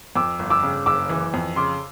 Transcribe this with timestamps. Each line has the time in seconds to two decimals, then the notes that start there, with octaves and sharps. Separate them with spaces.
0.16 F2 D6 E6
0.39 G1
0.50 D6 E6
0.63 C#3
0.86 F#1 D6 E6
1.09 E3
1.34 F2
1.56 C#3 C6 D6